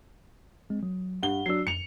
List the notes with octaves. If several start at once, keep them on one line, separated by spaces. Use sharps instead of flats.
G#1 G#3 C4
F#3
G2 F#5 G7
F#3 D4 E6 C7
F2 C#7 F7